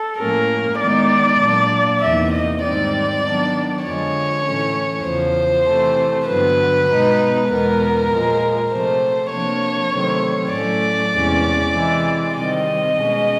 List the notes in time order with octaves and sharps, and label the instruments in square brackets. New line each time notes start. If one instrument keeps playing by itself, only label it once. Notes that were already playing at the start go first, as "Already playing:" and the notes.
Already playing: [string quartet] A4
A2 F3 A#3 C#4 A#4
D#3 G#3 B3 D#4 D5
A#2 F#3 A#3 D4
E2 C3 F3 A#3 D#4 E5
D#5
G#2 D#3 G3 C4 D#4 D5
D#3 F#3 B3 D4
F2 D3 F3 G#3 C#5
A2 E3 A3 C#4
E2 C#3 F3 C5
C3 E3 A3
G2 D3 F#3 B3 B4
B2 G#3 B3 D#4
E2 B2 G#3 B3 A#4
A#2 F3 G#3
C3 F3 A3 C5
C3 F3 A#3 D4 C#5
C3 D#3 F#3 A3 C4
A2 F#3 A3 C#4 D5
E2 C3 E3 G#3 C#4
C3 E3 G#3
C3 D#3 G3 C4 D#5
B2 G#3 C#4